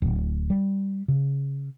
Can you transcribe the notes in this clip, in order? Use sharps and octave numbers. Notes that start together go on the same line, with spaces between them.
D1
G3
C#3